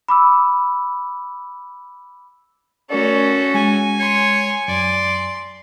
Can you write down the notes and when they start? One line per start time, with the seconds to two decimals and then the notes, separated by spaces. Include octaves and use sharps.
0.08 B5 D6 E6
2.90 A3 C#4 F#4 A4 A#4 D5
3.54 G#3 G#5
3.99 C#5 C6
4.68 F#2 D5 C6